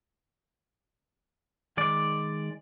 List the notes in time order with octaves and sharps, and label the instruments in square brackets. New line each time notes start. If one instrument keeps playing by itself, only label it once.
[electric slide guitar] D#3 G#3 D5